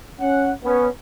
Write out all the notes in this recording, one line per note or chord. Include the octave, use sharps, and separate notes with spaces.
C#4 F#5
B3 C#4